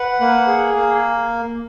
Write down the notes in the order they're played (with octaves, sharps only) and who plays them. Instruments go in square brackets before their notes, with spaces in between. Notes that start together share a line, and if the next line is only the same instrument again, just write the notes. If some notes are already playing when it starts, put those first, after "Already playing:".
Already playing: [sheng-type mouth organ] B4 F#5
A#3
G#4
A#3